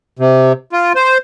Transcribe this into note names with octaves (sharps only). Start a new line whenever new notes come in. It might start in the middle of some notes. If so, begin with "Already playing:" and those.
C3
F4
C5